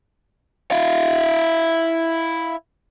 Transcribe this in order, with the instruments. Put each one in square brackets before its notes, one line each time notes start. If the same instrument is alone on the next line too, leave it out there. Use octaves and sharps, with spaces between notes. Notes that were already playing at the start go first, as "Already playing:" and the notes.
[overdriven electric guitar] E4 F5